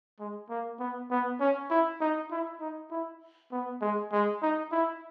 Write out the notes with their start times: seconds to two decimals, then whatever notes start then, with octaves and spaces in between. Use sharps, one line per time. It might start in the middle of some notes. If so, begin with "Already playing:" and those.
0.19 G#3
0.49 A#3
0.79 B3
1.11 B3
1.40 C#4
1.70 E4
2.01 D#4
2.31 E4
2.60 D#4
2.91 E4
3.52 B3
3.82 G#3
4.12 G#3
4.42 D#4
4.72 E4